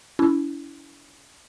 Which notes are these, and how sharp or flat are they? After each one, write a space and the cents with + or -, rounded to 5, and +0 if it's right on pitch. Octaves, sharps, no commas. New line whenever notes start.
C#4 +45 E4 +0